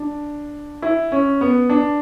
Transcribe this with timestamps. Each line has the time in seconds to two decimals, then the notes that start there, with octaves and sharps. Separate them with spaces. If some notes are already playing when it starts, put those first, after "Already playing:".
Already playing: D4
0.82 E4
1.12 C#4
1.41 B3
1.70 D4